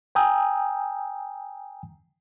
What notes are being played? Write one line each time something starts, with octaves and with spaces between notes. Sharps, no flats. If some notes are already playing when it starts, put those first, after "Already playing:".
G5 G#5 A#5 D#6 E6 G6